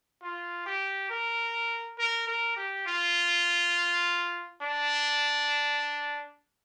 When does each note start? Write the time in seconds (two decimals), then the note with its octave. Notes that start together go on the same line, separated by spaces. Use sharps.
0.22 F4
0.66 G4
1.10 A#4
1.99 A#4
2.27 A#4
2.57 G4
2.86 F4
4.62 D4